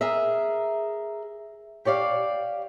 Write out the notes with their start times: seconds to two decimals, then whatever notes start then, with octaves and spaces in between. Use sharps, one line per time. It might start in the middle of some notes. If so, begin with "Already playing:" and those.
0.01 G#4 A#4 E5
1.85 G4 C#5 D5 F5